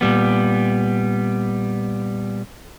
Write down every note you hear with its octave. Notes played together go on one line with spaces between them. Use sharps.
A#2 G3 B3